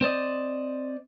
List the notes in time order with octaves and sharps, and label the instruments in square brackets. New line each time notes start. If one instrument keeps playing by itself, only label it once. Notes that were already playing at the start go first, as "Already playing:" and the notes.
[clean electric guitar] C4 C5 D5 D#5